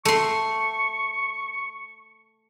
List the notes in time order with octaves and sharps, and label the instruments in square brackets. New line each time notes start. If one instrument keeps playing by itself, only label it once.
[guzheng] A3 C6 [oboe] C#6